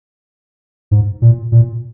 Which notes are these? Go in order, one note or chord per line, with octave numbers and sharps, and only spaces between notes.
G#2
A#2
A#2